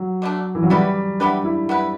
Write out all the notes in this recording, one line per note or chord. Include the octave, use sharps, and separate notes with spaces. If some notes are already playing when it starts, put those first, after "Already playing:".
Already playing: F#3
D3 A3 D4
E3
F#3
G3 B3 E4 G4 B4
B3 D4 E4 G4 B4
E4
B3 E4 B4